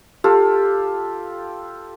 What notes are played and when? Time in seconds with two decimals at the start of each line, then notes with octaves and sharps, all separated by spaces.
0.24 F4 G4 A4